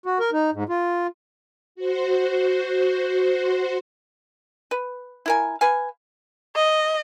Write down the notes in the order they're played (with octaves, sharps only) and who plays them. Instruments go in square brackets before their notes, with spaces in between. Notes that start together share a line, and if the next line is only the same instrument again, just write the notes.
[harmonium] F#4
A#4
D#4
G#2
F4
[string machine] F#4 C5
[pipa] B4
E4 A#4 G#5
B4 F5 G#5
[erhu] D#5